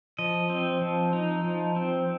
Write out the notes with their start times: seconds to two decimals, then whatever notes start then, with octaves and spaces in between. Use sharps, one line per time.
0.19 F3 D#5
0.50 C4
0.81 F3
1.13 D#4
1.44 F3
1.76 C4